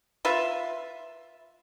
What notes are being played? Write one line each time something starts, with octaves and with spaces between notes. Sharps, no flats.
F4 B4 E5